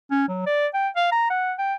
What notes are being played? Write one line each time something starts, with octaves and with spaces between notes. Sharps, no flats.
C#4
F#3
D5
G5
F5
A#5
F#5
G5